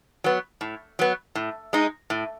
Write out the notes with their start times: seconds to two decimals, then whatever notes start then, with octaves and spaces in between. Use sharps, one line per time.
0.24 F#3 B3
0.61 A2
0.99 F#3 B3
1.35 A2
1.73 G#3 D#4
2.10 A2